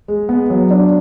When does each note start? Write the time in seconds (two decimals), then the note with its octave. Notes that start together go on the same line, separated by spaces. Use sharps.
0.08 G#3
0.29 B3
0.50 F#3
0.71 D4